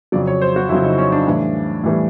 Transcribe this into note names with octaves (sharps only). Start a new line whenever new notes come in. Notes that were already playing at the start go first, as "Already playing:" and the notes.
F2 C#3 F#3 D5
C#5
C5
F#4
F2 C#3 F#3 E4
D#4
C#4
D4
A2 E3 G3
A2 E3 G3